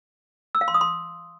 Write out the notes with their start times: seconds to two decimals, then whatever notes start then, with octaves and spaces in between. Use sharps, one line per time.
0.55 E6
0.61 F5
0.68 C6
0.74 D#6
0.81 C6